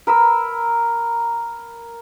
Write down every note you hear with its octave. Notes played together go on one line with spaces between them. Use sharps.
A#4 B5 E6